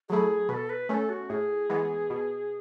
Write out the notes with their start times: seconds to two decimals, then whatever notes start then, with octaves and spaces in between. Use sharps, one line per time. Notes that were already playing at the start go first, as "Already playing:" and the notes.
0.09 F#3 A3 E4 G#4
0.49 B2 B4
0.54 A4
0.70 B4
0.89 A3 C#4 A4 B4
1.09 F#4
1.30 A2 G#4
1.69 E3 G#3 B3
2.10 B2